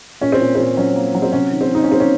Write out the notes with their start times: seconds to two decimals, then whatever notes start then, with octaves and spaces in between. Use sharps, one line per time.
0.21 A#2 C#4
0.32 C4
0.40 A#2
0.55 A#2 C4
0.77 F#3 C#4
0.96 A#3
1.15 F#3
1.22 C4
1.33 C3 C#4
1.52 D#3
1.61 C4
1.70 D#3 D#4
1.83 C#4
1.89 A#3 C4
2.00 C#4